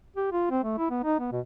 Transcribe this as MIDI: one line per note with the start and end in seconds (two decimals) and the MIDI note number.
0.16 0.27 67
0.32 0.49 65
0.51 0.61 60
0.64 0.74 57
0.78 0.87 64
0.90 1.01 59
1.03 1.18 63
1.19 1.30 59
1.32 1.40 47